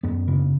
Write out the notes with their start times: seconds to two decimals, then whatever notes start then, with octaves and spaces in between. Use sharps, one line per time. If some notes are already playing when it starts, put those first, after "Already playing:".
0.03 F#2 B3
0.27 C#3